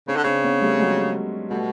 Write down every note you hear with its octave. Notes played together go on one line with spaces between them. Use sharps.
C#3 C4 D4
D3
C#3 C4 D4
B3 C#4
G3 A3
F#3 G#3
B2 G3 A3